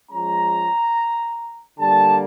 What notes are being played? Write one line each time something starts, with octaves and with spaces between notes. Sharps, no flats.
F3 G#3 C#4 A#5
D3 G3 A#3 A5